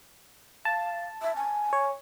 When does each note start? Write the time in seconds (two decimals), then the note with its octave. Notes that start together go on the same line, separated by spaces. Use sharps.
0.65 F5 A5
1.22 E5
1.36 G#5
1.73 C#5